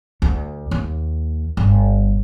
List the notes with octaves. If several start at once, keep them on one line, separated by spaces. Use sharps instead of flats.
D2
D#2
G1